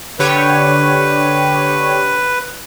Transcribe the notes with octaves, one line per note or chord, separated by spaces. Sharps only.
D3 G4 B4 C#5